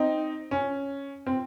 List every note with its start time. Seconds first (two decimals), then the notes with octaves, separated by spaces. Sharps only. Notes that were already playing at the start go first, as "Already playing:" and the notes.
Already playing: C4 D#4
0.51 C#4
1.27 C4